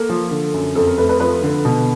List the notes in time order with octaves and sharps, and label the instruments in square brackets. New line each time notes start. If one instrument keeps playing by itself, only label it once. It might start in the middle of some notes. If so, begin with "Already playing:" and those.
Already playing: [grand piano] A#3 [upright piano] A4
[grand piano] F3
D3
F#2
[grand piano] F2 [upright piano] A4
[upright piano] A#4
[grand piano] A3 [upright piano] B4
[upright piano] B4
[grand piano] F3 [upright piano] B4
[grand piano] D3
B2